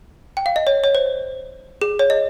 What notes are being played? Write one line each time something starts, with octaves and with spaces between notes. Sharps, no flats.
G5
F5
D#5
C#5
C#5
C5
G#4
C#5
D#5